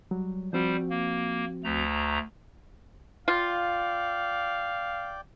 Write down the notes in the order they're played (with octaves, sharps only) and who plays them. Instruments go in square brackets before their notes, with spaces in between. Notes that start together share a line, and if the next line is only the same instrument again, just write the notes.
[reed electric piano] F#3 G3
[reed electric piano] F3 C4 F#4 [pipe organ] G3 C5
[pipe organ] A#3
D2 A3 A#5
[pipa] F4 [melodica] D5 G5 [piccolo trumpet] F5